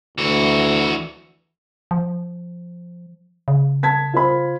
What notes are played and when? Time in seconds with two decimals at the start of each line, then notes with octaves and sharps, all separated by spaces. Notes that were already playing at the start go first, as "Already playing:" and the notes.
0.18 D2 E3 F#4
1.91 F3
3.48 C#3
3.83 A5 G#6 B6
4.13 F4 C5 B5